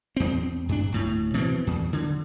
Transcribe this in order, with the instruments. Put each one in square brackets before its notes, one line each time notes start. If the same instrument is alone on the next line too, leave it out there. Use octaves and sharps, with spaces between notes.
[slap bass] E2 C4
G2 D4
D1 A2
B2 E3 B3 C4
E2
D3